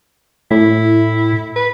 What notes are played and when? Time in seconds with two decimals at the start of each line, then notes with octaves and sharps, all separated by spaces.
0.51 A2 E4
1.56 B4